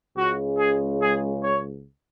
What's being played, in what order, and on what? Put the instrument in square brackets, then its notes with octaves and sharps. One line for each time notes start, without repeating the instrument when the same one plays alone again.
[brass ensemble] C#2 C#3 G#3 F#4
G#4
G#4
C#5